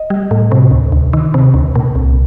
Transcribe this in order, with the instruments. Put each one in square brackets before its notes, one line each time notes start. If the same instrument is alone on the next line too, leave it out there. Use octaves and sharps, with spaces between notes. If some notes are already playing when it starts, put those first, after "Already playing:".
Already playing: [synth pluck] D#5
G3
A2
C3
D2
D2
D#3
C3
D2
A#2
C2